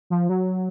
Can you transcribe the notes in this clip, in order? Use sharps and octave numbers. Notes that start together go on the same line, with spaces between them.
F3
F#3